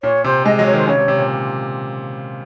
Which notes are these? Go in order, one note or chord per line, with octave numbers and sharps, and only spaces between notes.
A#2 C#5
C3 C5
G#3 D#5
F#3 D#5
C#5
D#3
C5
C#3 C#5
C3
C3
A#2